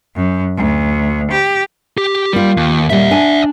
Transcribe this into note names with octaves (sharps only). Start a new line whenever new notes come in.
F#2
D2
G4
G4
G3 A#3 F4
D#2
D#2 A#2 G3 D5 E5
D4 G#5